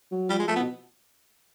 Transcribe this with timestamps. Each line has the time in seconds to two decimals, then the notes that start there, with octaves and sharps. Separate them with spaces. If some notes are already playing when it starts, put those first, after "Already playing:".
0.11 F#3
0.30 F3 G3
0.39 G#3
0.48 F3 A3
0.56 B3
0.61 B2